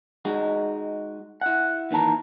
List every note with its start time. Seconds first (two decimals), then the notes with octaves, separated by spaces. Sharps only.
0.25 G#3 D#4 F#4
1.41 E4 F#5
1.91 D#2 D#3 E3 A5 A#5